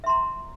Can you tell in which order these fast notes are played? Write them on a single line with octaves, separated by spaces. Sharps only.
E5 C6 A#5